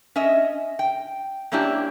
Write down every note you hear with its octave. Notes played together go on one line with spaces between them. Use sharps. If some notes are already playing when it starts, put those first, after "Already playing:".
C#4 D#5 E5
G5
F#3 A#3 C#4 D4 E4 G4